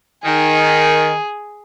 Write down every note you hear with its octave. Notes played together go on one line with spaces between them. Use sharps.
D#3 G#4